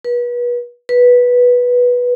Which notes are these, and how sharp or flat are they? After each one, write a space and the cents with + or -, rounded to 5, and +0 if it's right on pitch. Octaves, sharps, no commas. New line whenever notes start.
B4 -35
B4 -10